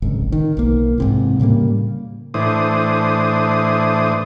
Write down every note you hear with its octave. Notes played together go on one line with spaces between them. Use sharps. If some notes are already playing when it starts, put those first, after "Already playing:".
D1 G#1 C#2
D#3
B1 A#3
G#2 C3 E3
A2 C#3 G3 A#3
A2 E3 D4 C5 D#6